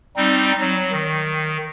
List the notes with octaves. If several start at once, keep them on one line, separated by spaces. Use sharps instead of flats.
G3 C4 D#4
F#3
D#3